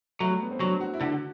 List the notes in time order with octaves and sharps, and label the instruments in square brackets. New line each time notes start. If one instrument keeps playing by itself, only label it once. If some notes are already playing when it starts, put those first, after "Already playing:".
[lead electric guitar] F#3 [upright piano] A3
[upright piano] G3
B3
C4
[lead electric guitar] F#3 [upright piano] D4
[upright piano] F#4
E4
[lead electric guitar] D3 [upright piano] F#4
[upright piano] F#4